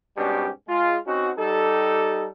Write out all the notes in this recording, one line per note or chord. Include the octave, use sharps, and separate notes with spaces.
G#2 B2 G3 C#4 D4 G4
G#3 F4
C4 C#4 D#4 F#4
G3 D#4 G4 A4